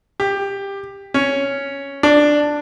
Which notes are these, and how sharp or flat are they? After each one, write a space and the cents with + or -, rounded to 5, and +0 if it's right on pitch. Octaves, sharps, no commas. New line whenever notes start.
G4 +15
C#4 +5
D4 +5